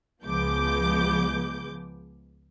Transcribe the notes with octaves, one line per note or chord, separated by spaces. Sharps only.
C#2 F3 G#3 B3 D6 G6